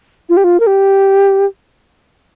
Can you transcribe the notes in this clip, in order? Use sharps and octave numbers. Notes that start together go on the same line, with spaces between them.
F4
G4
F4
A#4
G4